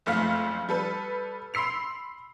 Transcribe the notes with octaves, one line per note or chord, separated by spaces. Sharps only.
F#1 F2 A3 F5 F6 B6
G3 A4 B4
B5 C6 E6 C7 F7